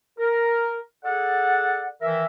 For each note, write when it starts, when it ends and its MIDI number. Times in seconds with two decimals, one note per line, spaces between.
0.18 0.79 70
1.05 1.88 68
1.05 1.88 69
1.05 1.88 74
1.05 1.88 78
2.01 2.26 51
2.01 2.26 52
2.01 2.26 70
2.01 2.26 76